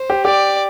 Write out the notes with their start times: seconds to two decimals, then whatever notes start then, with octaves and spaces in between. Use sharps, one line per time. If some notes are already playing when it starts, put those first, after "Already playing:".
Already playing: C5
0.10 G4
0.25 G4 D5